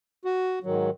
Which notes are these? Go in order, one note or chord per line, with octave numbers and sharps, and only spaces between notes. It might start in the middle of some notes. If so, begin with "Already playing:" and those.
F#4
G#2 D#3 F#3